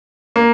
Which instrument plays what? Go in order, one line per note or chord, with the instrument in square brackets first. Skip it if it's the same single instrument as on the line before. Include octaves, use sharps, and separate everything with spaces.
[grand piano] A#3